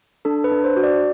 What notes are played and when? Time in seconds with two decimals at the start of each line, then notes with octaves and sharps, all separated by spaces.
0.25 D4 A4
0.44 B4
0.52 D4
0.64 C5
0.76 F#4
0.83 D5